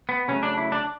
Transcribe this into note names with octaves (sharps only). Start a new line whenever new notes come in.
B3
C#3 F#3 A3 C#4
D4
E4
D4